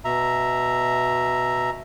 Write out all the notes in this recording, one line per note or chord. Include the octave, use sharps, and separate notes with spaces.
B2 E5 A#5